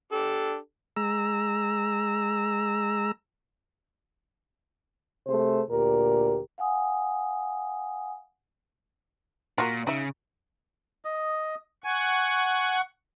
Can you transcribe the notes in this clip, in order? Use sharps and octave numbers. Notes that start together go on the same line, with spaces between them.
D4 G4 A4
G#3 A#5 E6
C3 A3 G#4 C5
D2 A#2 G4 A#4
F5 F#5 G#5 D#6
A#2 F4 F#4 A#4
C#3 D#4 E5
D#5
F#5 G#5 C#6